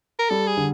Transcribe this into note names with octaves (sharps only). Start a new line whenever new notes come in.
A#4
G3 A4
G#4
D3